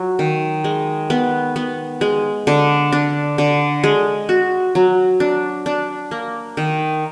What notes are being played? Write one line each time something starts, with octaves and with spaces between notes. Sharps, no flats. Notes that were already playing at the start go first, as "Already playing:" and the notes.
Already playing: F#3 F4
D#3
G#3
B3
B3
G#3
D3
D4
D3
G#3
F#4
F#3
D4
D4
A#3
D#3